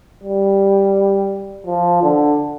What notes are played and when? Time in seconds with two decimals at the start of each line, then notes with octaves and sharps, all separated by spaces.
0.23 G3
1.67 F3
2.03 D3